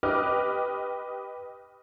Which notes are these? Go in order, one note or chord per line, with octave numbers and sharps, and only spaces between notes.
G4 B4 D#5 D6 D#6 F6